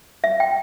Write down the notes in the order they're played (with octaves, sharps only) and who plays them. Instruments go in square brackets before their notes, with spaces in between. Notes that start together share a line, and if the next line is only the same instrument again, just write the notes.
[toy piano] E5
G5